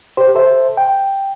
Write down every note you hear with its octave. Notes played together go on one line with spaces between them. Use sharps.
G4 C5
A4 C5 E5
G5